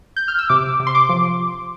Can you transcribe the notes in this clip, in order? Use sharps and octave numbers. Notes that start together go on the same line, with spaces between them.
G6
F6
E6
C3 D6
C3
C6
D6
F3